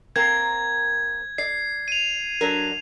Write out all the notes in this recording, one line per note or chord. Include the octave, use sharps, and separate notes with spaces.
A#3 C4 A#4 G#6
D5 C7
D#7 F7
F#3 D4 A#4